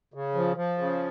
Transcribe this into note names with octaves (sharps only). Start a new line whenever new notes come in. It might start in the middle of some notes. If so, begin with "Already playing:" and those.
C#3
F3
F3
C#3